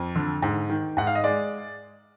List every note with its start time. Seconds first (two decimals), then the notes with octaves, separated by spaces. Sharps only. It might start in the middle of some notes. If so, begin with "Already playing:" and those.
Already playing: F2
0.16 D3
0.42 G#2
0.70 D#3
0.97 G#2 F#5
1.07 F5
1.15 D#5
1.24 G#3 D5